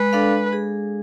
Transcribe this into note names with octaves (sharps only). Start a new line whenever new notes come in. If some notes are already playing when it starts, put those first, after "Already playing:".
Already playing: G#3 B4
D4 A4 D5 F5
G#3
G#4